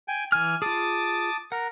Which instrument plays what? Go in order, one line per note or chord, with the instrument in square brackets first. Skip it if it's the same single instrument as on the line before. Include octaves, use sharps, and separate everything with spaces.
[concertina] G5 G#5
[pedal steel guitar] E3 F6 [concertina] G#5
[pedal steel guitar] F4 G#4 [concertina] A5 D6 D#6
[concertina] A#4 [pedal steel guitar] F#5